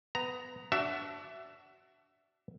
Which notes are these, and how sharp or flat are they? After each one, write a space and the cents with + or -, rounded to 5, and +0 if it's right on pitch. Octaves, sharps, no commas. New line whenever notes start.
B3 +20 A#5 +0
D4 -10 F#4 +25 E5 +15